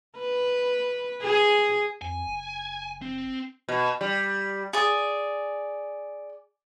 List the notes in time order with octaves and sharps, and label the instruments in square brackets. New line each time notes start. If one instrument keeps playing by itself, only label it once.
[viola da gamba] B4
G#4
[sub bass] F2 [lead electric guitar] G#5
[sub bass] F#1
[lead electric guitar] C4
[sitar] B2
G3
[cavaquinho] G#4 D5